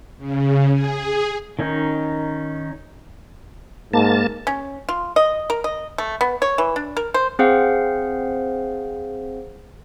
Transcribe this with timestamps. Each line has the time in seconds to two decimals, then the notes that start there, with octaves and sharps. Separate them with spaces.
0.18 C#3
0.71 G#4
1.59 D#3 C#4 D#4
3.94 G#2 A#3 A5
4.47 C#4
4.89 F4
5.16 D#5
5.50 A#4
5.64 D#5
5.98 A3
6.21 B3
6.42 C#5
6.58 E3
6.76 D4
6.97 A#4
7.14 C5
7.39 C4 G#4 C5 F5 F#5